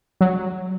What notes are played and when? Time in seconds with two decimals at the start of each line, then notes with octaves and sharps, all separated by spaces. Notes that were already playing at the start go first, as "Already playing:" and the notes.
0.21 F#3